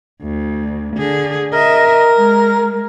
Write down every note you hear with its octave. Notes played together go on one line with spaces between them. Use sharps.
D2
D3 G#4
A#4 D#5 E5
G#3